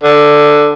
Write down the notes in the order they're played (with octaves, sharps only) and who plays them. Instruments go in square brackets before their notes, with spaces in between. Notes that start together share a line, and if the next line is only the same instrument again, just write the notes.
[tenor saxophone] D3